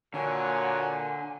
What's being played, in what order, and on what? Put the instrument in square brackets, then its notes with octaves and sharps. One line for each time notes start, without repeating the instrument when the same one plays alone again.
[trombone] A#2 [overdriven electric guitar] D3 [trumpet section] A#3 F#4 C#5 [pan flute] G#5